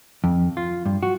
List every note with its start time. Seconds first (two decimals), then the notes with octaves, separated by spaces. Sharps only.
0.24 F2
0.57 F4
0.86 G2
1.03 F#4